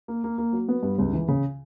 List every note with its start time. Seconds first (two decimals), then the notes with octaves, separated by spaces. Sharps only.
0.08 A#3
0.24 A#3
0.38 A#3
0.53 F#3
0.68 B3
0.83 G2
0.98 C#2
1.13 E3
1.28 C#3